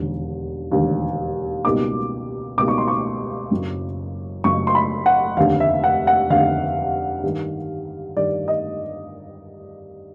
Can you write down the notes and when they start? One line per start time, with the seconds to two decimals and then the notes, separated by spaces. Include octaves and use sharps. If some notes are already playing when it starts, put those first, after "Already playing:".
Already playing: E1 D#2 D3
0.71 E1 D#2 D3
1.64 C#2 B2 G3 A#3 D#4 D6
2.57 C#2 B2 G3 A#3 D#4 D6
2.68 C#6
2.78 C6
2.88 C#6
3.51 F#1 F#2 C#3
4.44 F#1 F#2 C#3 C#6
4.67 C6
4.75 B5
5.06 F#5
5.37 F1 D#2 D3 F5
5.60 E5
5.84 F#5
6.07 F#5
6.30 F1 D#2 D3 F5
7.23 G2 D#3 G3
8.16 G2 D#3 G3 D5
8.48 D#5